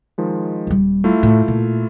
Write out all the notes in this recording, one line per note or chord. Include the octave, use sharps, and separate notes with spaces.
D#3 F3 G#3
D#1 G3
A3 E4 F4
A2
A#2